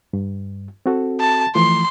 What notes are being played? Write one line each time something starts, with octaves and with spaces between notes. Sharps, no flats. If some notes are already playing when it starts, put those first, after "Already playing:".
G2
C4 F#4 A4
A5
E3 F3 A3 C6